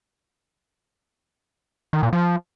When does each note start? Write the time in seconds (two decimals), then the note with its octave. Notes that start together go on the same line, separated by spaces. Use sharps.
1.93 D#3
2.03 A#2
2.13 F3